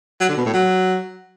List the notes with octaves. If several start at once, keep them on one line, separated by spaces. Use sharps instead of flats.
F#3
D3
B2
A2
F#3